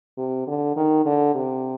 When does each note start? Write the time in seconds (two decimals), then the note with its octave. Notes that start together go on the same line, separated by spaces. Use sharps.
0.17 C3
0.47 D3
0.76 D#3
1.05 D3
1.35 C3